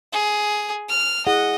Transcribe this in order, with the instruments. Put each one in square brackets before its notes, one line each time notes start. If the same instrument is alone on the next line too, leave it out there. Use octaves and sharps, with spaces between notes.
[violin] G#4
F6
[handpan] E4 G#4 F#5 [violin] D#5